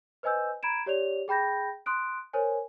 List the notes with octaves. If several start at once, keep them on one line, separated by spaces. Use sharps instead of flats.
B4 C5 D#5 G#5 E6 G6
A#5 B5 G#6 D7 E7
G4 C#5 D5 F7
G#4 G5 B5 G6 A#6
C6 D#6 F#6 D7
A#4 C5 C#5 G#5